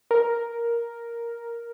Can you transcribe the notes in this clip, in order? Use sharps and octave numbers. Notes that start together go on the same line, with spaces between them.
A#4